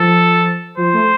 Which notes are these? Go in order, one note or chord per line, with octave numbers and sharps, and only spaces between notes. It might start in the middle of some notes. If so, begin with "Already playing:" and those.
Already playing: F3 A4
F3 C5
A3